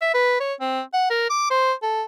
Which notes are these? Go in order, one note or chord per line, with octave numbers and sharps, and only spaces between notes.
E5
B4
C#5
C4
F#5
A#4
D6
C5
A4